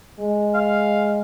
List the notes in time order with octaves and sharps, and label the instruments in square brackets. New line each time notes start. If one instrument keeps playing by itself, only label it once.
[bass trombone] G#3
[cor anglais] F5